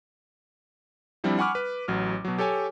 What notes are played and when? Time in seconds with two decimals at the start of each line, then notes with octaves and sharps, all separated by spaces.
1.24 F3 G3 C4 D4 E4 F4
1.39 F#5 G#5 B5 C#6 D6 F6
1.55 B4
1.88 A1 F#3 F6
2.25 B2 F#3
2.38 G4 A4 C#5 G#5